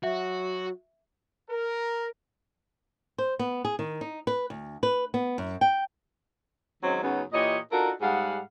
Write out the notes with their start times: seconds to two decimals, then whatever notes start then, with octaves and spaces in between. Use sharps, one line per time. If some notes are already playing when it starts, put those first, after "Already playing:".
0.04 F#3 F#4 E5
1.50 A#4
3.18 C5
3.39 B3
3.65 G#4
3.79 D#3
4.01 D#4
4.27 B4
4.50 D2
4.83 B4
5.14 B3
5.38 F#2
5.61 G5
6.83 D#3 F#3 G#3 C4 C#4
7.03 F#2 C#3 F#3 B3 D#4 F#4
7.32 A#2 E3 G4 C#5 D#5
7.72 D4 D#4 F4 F#4 A4 A#4
8.01 G#2 G3 G#4 F5 F#5